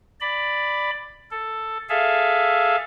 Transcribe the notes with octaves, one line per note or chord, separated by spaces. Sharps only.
D5 B5
A4
G#4 A4 E5 F5